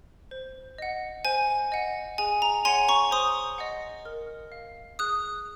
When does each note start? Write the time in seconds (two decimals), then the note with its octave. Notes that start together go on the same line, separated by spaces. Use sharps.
0.31 C5
0.78 D#5 F#5
1.25 C5 G#5
1.72 D#5 F#5
2.18 G#4 G#5
2.42 A#5
2.65 C#5 F#5 G#5 C6
2.88 A#5 C#6
3.11 C5 C6 D#6
3.58 D#5 F#5
4.05 A#4
4.52 F5
4.99 G#4 D#6 F#6